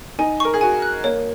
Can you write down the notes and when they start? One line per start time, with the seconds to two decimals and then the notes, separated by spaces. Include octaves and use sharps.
0.19 D#4 G#5
0.40 A#4 C#6
0.53 G#4
0.61 F#4 G#5
0.82 F#6
1.04 A#3 C#5